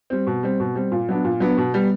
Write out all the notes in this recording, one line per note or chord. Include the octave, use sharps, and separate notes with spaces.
G3 C4
B2
G3 C4
B2
G3 C4
A#2
F#3 B3 D4
A#2
F#3 B3 D4
B2
G3 B3